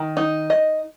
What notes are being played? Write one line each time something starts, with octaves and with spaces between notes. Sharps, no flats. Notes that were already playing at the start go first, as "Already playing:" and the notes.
Already playing: D#3
D#4
D#5